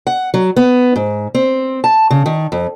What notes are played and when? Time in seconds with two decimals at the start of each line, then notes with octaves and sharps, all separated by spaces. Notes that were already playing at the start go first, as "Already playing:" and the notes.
0.07 F#5
0.34 F#3
0.56 B3
0.96 G#2
1.35 C4
1.84 A5
2.10 C#3
2.26 D#3
2.52 F2